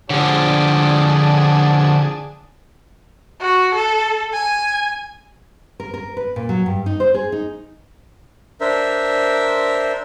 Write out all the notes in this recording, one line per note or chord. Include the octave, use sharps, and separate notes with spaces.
D3 F3 D4 G#4 D5
F#4
A4
G#5
A#4
A#4
B4
A#2
F#3
G2
D#4
C5
G#4
D#4
D4 A#4 C5 E5